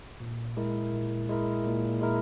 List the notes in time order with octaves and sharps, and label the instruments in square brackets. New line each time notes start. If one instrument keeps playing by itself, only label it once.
[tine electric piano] A#2
G#3 E4 A#4
A#2
G#3 E4 A#4
A#2
G#3 E4 A#4